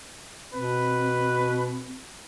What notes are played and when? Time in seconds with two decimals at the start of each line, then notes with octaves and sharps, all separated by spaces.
0.54 B2 C4 B4